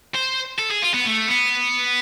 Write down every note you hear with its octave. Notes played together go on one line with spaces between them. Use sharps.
C5
A4
G#4
F4
B3
A3
B3